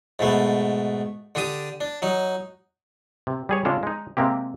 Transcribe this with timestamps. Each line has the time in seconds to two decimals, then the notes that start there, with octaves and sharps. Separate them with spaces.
0.19 G#2 B2 A3 B3
1.35 D3 D4 G4 D#6
1.81 D4
2.02 F#3 D#4
3.27 C3
3.49 G3 G#4 C#5
3.65 C#3 G#3 D4 F4 A4
3.83 G#3 D#4
4.17 C3 G#3 A#3 C4 G4